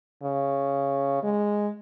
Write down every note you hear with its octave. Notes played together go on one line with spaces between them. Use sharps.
C#3
G#3